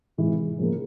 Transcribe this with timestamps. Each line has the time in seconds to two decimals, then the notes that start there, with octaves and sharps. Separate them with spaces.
0.17 C3 E3 G#3
0.58 C#3 F3 A#3